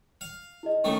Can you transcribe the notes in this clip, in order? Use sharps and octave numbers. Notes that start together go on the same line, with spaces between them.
F5
E4 G#4 D#5
F#2 D#3 A3 G5